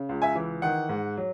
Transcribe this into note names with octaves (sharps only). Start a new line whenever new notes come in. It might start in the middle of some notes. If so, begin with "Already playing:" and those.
Already playing: C#3
C#2
E5 G#5
E3
D#3 F#5
G#2
F#3